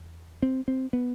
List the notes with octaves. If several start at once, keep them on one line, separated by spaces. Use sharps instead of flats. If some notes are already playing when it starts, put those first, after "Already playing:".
Already playing: E2
C4
C4
B3